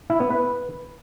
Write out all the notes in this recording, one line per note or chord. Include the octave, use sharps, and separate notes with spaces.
E4
B3
B4